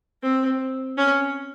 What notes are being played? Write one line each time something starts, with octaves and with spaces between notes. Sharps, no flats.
C4
C#4